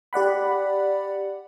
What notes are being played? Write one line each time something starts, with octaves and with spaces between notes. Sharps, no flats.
G4 D5 F#5 B5